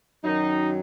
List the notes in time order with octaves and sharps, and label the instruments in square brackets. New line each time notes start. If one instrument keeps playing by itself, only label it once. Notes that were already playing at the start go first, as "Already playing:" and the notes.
[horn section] F#2 D#3 F#3 D#4